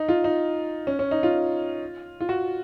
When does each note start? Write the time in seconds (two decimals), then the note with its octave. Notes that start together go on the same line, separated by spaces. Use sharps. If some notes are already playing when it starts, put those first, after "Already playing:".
Already playing: D#4
0.09 F4
0.24 D#4
0.87 C#4
0.99 C#4
1.11 D#4
1.23 F4
2.20 F4
2.29 F#4